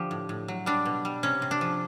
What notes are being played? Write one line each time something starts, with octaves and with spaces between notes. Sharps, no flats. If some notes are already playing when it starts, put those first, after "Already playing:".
Already playing: D3 F3 G4
A2
A2
F#3
G3 D4
B2
G3
C3 C#4
C3
D4
F3